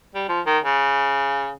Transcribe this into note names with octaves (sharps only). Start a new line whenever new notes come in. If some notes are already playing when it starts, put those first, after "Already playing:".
G3
F3
D#3
C#3